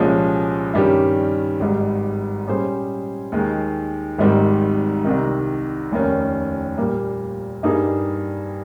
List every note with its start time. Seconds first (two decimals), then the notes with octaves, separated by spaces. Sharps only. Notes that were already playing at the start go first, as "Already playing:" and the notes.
Already playing: C2 A#2 F3 G#3 C#4
0.74 G2 D#3 G3 C#4 G4
1.60 G#1 G#2 G3
2.47 A#2 G3 C#4 G#4 C5
3.32 D#2 D#3 G#3
4.18 G#1 G#2 D#3 G3 C4
5.04 C2 C3 D#3
5.91 F1 D#2 D#3 A#3 C#4
6.78 A#2 G3 A#3
7.63 G2 G3 A#3 D#4 G#4